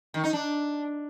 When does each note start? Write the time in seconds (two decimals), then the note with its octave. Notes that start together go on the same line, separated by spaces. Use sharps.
0.14 D#3
0.24 D#4
0.33 D4